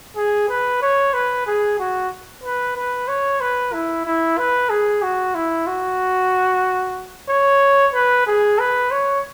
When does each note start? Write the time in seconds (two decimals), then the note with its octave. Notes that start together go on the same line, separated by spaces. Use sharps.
0.16 G#4
0.49 B4
0.82 C#5
1.14 B4
1.46 G#4
1.79 F#4
2.43 B4
2.76 B4
3.08 C#5
3.40 B4
3.73 E4
4.06 E4
4.38 B4
4.70 G#4
5.02 F#4
5.35 E4
5.67 F#4
7.29 C#5
7.94 B4
8.26 G#4
8.59 B4
8.91 C#5